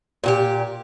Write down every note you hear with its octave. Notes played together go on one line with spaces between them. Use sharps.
A#2 F#4 G4